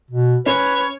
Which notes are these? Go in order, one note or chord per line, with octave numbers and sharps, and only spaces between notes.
B2
C#4 B4 C#5